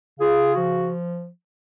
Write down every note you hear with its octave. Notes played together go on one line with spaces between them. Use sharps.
C#3 F4 G#4
F3 F#4